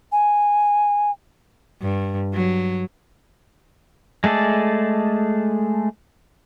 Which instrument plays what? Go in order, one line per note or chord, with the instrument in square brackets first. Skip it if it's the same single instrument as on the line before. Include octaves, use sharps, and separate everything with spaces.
[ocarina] G#5
[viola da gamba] G2
F#3
[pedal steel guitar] G#3 A3 G#4 A4 D5